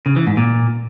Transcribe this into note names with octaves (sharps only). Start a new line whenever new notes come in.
C#3
E3
G#2
A#2